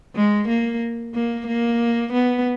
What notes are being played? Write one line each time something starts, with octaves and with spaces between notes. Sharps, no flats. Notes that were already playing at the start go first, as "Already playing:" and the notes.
G#3
A#3
A#3
A#3
B3